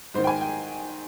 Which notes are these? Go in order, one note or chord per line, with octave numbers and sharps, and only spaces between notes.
G#2 D#3 C5
G5
G#5
G5